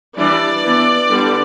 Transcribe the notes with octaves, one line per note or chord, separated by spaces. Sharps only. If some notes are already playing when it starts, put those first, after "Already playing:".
E3 G3 D4 D5
E3 B3 D4
D3 G3 B3 D4